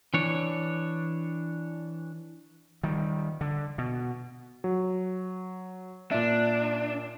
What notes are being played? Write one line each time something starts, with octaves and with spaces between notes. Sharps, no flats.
E3 D4 C#5
D#3 G3
D3
B2
F#3
A#2 D4 E5